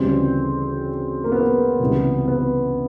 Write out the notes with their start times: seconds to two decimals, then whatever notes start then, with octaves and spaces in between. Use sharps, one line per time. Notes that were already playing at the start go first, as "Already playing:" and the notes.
Already playing: D2 C#3 E3 G3 C4
1.24 A#3
1.32 B3
1.80 C#2 C3 E3 G3
2.28 B3